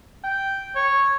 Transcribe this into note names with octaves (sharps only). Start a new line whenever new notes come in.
G5
C#5